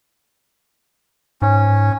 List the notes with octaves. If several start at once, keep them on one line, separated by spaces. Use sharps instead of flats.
G#2 C#4